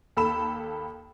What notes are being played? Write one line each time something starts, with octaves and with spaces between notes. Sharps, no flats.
D#2 A4 B5 E7